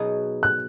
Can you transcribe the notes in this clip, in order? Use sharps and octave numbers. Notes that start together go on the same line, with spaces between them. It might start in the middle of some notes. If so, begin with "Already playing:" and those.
Already playing: B2 F#3 B3 D#4 G#4
F#6